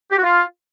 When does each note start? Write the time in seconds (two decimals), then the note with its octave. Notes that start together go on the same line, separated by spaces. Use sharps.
0.11 G4
0.17 F#4
0.23 F4